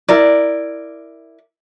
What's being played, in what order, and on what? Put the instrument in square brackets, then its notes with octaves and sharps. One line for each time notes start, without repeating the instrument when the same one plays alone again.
[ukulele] E4 A#4 D5